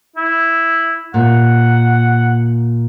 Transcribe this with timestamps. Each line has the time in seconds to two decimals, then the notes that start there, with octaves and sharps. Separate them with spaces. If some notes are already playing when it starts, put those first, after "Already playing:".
0.16 E4
1.14 A#2 F#5